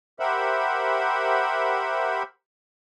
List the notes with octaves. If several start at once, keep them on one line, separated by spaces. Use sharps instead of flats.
G4 A#4 C5 E5 F#5 B5